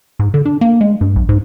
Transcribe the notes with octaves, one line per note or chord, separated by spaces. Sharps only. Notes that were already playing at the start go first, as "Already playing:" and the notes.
G#2
D3
D4
A#3
G#3
G2
B1
G#2